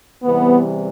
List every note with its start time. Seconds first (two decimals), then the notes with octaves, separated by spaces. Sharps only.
0.23 E2 C3 E3 G3 B3